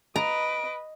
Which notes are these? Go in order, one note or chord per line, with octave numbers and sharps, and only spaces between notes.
B4 D#5 A#5 D7